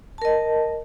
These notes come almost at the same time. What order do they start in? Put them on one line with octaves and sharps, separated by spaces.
A5 A#4 D#5